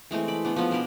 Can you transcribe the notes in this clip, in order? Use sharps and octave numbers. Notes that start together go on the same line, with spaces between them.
E3 G#3 A3 C4
D5 B5
A3 B3 D4
F3 G#3 B3 C#4
B2 D4 A#4 B4